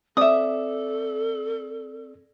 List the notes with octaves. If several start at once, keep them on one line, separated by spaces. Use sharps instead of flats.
C4 A4 D5 E5 D#6